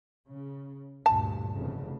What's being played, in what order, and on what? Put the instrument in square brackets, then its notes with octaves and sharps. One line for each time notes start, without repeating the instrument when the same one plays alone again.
[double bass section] C#3
[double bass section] D2 G2 A#2 [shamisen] A5
[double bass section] F1 E2 C#3